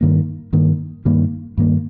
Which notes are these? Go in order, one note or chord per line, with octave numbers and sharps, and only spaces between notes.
G2 D#3 A#3
G2 D#3 A#3
G2 D#3 A#3
G2 D#3 A#3